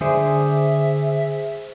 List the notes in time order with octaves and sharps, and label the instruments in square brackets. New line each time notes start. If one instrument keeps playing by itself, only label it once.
[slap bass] D3 [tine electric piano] G#4 C5 [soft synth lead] E5